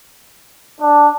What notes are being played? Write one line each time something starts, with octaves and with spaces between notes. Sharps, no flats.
D4